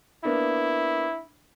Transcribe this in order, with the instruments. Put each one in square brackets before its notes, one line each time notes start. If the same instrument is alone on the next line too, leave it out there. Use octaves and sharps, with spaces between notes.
[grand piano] A#3 B3 D4 [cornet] E4